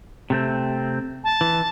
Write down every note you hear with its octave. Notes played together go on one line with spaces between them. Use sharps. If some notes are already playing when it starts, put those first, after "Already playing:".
C3 A3 C4
A5
E3